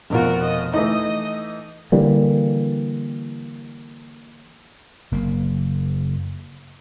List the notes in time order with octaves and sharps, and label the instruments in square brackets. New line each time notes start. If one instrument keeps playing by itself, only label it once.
[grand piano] F1 B2 F4 [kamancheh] F#4 A#4
[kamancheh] D#5
[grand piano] E3 A3 D#4 [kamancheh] D#5
[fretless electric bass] D3 E3 G3 A#3
[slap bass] F#1 A#3